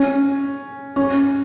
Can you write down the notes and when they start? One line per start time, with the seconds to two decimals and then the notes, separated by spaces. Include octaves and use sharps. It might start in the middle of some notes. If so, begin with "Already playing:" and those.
Already playing: C#4
0.96 C#4